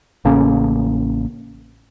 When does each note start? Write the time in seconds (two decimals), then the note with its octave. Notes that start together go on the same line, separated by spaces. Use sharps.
0.25 A1 C#3 A#3 C#4